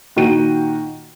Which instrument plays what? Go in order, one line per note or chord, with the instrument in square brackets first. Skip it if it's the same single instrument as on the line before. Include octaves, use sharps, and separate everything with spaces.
[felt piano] A#2 D#3 F#4 G5 D#7